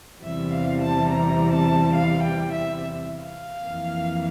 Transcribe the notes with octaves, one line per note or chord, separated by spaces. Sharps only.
E2 C3 E3 G3 C4 E5
F5
A5
A#5
A5
F5
G5
E5
F5
F2 E3 A#3